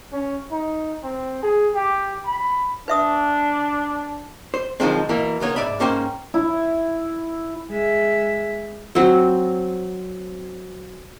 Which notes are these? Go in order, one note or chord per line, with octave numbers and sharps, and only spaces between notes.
C#4
D#4
C4
G#4
G4
B5
D4 B4 E5 D#6
C5
B1 F2 D#3 F3 G#3 C4
B2 E3 A#3
C#2 A#3 B3 C#5
G#2 B2 D5 E5 B5
G#2 A#3 C#4 C5 G5
E4
G#3 E5
F#3 C4